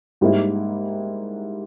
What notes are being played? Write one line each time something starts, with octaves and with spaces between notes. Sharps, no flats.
G#2 G3 A#3 E4